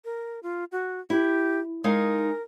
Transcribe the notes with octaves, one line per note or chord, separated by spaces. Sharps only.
A#4
F4
F#4
E4 G4
G#3 D#4 A#4 F5